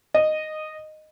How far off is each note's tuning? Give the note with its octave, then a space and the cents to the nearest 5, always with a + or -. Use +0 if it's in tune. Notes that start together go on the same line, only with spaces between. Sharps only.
D#5 -10